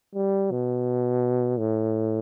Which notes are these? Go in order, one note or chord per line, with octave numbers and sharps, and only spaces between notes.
G3
B2
A2